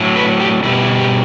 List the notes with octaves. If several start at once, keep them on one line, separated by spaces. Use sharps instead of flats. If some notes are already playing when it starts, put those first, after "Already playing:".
Already playing: A2 F#3
B4
G4
B2 G3 E4
E4
G4